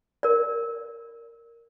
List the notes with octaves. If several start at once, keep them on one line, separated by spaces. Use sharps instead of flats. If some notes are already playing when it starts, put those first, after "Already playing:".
A#4 D5